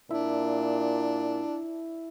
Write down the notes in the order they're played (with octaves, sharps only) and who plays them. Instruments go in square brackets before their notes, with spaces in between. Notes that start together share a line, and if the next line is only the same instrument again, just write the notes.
[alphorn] A#2 [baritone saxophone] D4 [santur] E4